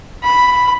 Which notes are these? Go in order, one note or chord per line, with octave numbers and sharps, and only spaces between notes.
B5